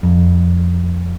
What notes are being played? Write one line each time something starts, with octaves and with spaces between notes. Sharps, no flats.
F2